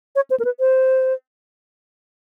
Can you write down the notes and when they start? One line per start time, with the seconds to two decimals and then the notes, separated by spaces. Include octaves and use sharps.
0.16 C#5
0.30 C5
0.40 A#4
0.45 B4
0.60 C5